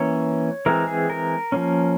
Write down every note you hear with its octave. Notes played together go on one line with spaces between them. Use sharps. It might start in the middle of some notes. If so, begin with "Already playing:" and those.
Already playing: E3 A#3 C#4 C#5
E3 G#3 C4 A#4
G#4
A#4
F3 A#3 C#4